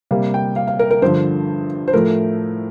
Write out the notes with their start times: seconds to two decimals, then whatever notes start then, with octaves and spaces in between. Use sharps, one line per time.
0.11 C3 G3 A#3 F5
0.34 G5
0.56 F5
0.67 F5
0.79 A#4
0.91 A#4
1.02 G2 D3 F3 C5
1.88 C5
1.93 A2 F3 A3 A#4